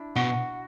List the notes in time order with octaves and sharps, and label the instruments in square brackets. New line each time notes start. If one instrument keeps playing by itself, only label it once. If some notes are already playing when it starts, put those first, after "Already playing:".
Already playing: [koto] D4 E4
[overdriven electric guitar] B2 [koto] F#4